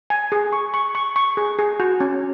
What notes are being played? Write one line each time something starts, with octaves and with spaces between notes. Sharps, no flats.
G#5
G#4
C#6
C#6
C#6
C#6
G#4
G#4
F#4
C#4